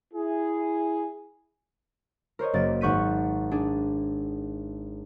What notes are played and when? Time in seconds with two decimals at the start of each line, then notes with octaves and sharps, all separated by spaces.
0.13 E4 G#4
2.39 A#4 C5 C#5 D#5
2.53 F#1 A#3 D5 A6
2.81 G#1 F#5 C#6 G6 B6 D#7
3.51 D4 G#4